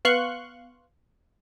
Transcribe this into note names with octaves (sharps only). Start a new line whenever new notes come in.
B3 F5 C6 C#6 F#6